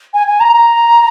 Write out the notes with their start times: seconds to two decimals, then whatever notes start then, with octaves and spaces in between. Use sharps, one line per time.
0.14 G#5
0.27 G#5
0.40 A#5
0.52 A#5